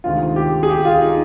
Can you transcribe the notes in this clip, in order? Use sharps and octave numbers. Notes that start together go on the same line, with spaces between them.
D2 C3 D#3 G#3 F4
G4
G#4
G4
F4
D#4